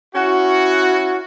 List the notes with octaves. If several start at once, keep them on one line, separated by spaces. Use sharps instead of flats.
C#4 E4 F#4